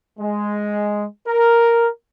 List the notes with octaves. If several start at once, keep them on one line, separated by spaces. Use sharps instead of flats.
G#3
A#4